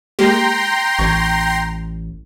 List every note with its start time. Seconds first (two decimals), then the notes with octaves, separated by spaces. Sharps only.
0.19 G#3 A#3 G4 G5 A#5 C6
0.99 A1 C#6 G#6